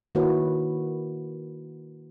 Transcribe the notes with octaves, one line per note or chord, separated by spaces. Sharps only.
D#3 A#3 E4 F#4 B4 C#5